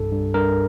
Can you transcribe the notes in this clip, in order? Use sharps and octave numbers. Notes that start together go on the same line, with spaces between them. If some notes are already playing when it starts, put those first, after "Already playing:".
Already playing: C2 G2 A4
G2
G2 A#4